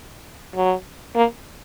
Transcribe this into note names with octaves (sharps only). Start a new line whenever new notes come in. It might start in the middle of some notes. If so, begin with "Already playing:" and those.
F#3
A#3